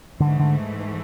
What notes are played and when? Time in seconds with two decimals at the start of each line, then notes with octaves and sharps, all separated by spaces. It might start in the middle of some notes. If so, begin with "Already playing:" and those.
0.20 G#2 D3 E3 A3
0.39 D3